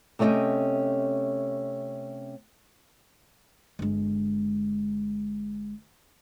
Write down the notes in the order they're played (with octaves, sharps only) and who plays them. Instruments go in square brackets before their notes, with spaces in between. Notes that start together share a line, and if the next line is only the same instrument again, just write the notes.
[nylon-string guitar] C3 A3 C#4 D5 D#5 G5
[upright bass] G1 G#3